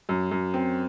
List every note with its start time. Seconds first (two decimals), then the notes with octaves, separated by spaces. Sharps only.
0.09 F#2
0.31 F#2
0.54 C4